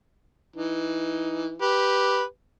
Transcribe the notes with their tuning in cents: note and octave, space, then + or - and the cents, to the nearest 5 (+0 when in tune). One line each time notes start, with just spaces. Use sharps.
E3 +0 D#4 +10
G4 +0 B4 -5